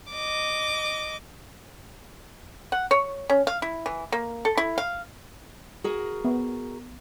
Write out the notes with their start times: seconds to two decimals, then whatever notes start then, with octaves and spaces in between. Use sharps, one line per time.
0.13 D#5 D6
2.72 F#5
2.91 C#5
3.30 C#4
3.47 F5
3.62 E4
3.86 E3
4.12 A#3
4.45 A4
4.57 E4
4.78 F5
5.84 F#4 G#4 A#4
6.25 B3